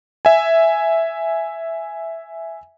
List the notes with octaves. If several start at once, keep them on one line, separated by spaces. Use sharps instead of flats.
E5 G#5